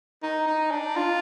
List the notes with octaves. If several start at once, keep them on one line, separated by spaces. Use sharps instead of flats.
D#4
D#4
D4
F4